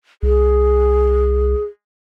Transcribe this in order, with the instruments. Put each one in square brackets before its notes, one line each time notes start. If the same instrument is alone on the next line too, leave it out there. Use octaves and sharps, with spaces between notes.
[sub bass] C2 [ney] G#4